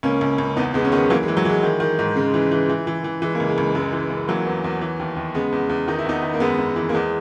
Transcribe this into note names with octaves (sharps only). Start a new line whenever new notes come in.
C#2 A#3 C#4
C#2
C#2
E2 B3 D#4
E2 G#3 B3
C#4
D#3 G#3 B3
E3 F#3 A#3
G#3
E3
F#3
E3 G#3
D#3
D#3
G#2
C#3 G#3
E3
E3
E3
E3
E3
E3 G#3
A#3
C#2
G#3
C#2
F#2 G#3
E3
F#2
E3 F#3 A#3
E2
E2
E3
D#2
D#2
C#3 G#3 B3
E2
E2
D#3 D#4
E4
E2 B3 D#4
D#3
A#3
F#2 G#3 B3
F#2
E3
A#3
E2 G#3